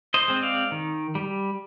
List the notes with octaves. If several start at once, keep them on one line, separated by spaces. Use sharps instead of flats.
C5 D#5
G#3 C4
D5 F5
D#3
G3